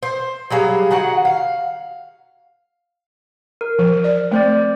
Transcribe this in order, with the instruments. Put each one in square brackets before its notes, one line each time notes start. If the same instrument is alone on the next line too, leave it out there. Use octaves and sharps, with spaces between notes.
[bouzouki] C5
F#3 G3 G#4 F5
D#3 F#4 G#4 F#5
F5
[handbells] A#4
[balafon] F3
D5
[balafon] A3 [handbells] C4 C5 D5